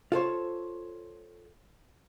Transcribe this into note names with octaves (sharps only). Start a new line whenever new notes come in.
F4 A4 C5 C#5